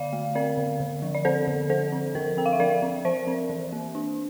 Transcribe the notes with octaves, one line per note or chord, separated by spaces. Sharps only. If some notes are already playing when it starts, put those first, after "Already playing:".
Already playing: D3 D5 F5
A3
C4 A#4 D5
D3
D3
F3
D5
C4 A4 C5
D3
F3 A4 C5
C4
F3 A#4
C4 G5
F5
E5
F3 A#4 D5
C4
F3 C5 E5
C4
E3
A#3
D4